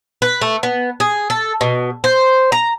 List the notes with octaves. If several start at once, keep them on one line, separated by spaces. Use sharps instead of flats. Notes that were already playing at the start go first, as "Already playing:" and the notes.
B4
A3
B3
G#4
A4
B2
C5
A#5